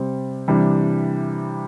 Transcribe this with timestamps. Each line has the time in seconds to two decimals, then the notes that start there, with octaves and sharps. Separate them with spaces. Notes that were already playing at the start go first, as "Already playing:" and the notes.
Already playing: C3 G3 C4
0.48 C3 E3 G3 D4